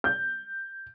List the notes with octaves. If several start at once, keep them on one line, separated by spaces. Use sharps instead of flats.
G6